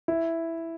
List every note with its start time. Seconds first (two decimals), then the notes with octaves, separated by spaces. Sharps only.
0.08 E4